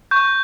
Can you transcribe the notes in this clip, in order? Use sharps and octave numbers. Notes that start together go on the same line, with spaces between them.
C#6 G6